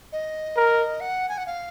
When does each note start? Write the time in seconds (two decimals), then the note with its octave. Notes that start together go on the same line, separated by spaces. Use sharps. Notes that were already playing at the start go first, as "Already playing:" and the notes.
0.12 D#5
0.57 A#4
1.00 F#5
1.29 G#5
1.38 F#5
1.46 F5